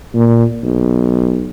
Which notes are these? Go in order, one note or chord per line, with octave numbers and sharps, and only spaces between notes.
A#2
B1